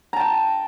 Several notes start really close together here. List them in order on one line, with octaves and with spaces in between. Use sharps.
A#5 A5 G5